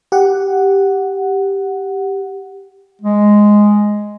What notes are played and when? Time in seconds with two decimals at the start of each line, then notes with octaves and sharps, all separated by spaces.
0.12 G4 F#5
3.02 G#3